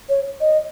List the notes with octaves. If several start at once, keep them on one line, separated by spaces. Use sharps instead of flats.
C#5
D#5